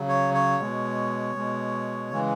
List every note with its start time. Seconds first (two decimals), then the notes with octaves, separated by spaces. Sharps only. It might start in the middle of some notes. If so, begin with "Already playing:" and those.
Already playing: C#3 F#3
0.09 C#5
0.34 C#5
0.60 B2 G#3
1.36 B2 G#3
2.11 C#3 E3 G#3